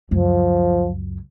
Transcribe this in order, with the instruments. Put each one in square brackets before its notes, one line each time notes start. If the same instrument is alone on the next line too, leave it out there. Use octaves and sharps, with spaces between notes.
[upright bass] C#2 F#2 [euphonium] F3